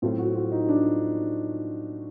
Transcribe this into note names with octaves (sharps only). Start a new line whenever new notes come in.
A2 F#3 A3 C4 F4
F#4
F4
D#4
D4